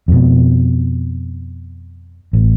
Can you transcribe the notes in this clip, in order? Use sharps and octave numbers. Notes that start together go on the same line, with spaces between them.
F2 B2
A1